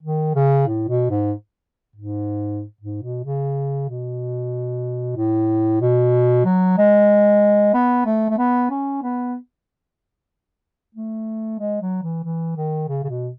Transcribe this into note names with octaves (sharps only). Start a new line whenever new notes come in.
D#3
C#3
A2
B2
G#2
G#2
G#2
B2
C#3
B2
A2
B2
F#3
G#3
B3
A3
A3
B3
C#4
B3
A3
G#3
F#3
E3
E3
D#3
C#3
C#3
B2